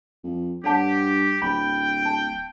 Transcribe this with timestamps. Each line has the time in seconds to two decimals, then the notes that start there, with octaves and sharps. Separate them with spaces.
0.24 F2
0.64 G2 G4 C#5 F#5 A5
1.42 D1 G5 B5
2.05 A5